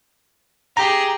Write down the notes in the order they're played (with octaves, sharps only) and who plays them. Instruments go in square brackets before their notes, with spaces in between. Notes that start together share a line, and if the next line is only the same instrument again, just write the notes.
[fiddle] G4 G#4 [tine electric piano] A#5